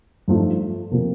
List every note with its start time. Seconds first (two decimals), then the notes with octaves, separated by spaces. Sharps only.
0.28 G2 F3 A3 D#4
0.92 C3 F3 A#3